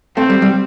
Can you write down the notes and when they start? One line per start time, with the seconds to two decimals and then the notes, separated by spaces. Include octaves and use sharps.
0.17 A3 C4
0.30 G3
0.42 G3